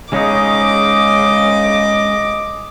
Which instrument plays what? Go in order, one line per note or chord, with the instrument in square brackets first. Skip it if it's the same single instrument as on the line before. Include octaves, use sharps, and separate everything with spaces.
[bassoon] C#3 [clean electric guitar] G#3 C#4 D#4 [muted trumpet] D#5 [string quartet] D6